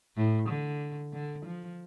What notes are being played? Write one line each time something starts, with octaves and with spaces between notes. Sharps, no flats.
A2
D3
D3
F3